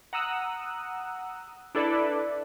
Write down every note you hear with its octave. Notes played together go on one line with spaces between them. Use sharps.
F#5 A#5 D#6 E6 F#6
D4 E4 A4 B4 D5